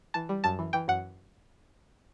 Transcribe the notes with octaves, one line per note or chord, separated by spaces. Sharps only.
E3 A5
G3
F#2 A5
E3
E3 G5
F#2 F#5